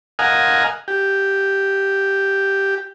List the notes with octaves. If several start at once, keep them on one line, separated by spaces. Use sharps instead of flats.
A#4 D#5 F5 F#5 G#5
G4